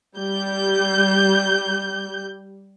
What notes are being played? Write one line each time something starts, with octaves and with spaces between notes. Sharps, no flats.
G3 G6